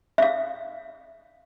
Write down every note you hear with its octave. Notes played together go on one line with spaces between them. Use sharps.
E5 F5